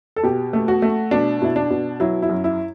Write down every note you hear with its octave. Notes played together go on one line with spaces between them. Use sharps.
A4
B2 G4
A3
F#4
A3
B2 D4
B2 E4
D4
B2
F#3 E4
E4
F#2
E4